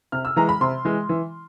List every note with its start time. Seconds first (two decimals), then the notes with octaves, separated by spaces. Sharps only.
0.12 C3 F6
0.25 E6
0.36 E3 G#3 A#5
0.49 B5
0.61 C3 C6
0.85 E3 G#3
1.09 E3